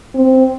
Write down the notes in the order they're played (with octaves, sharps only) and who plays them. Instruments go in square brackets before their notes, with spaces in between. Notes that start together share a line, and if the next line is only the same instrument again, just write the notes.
[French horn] C4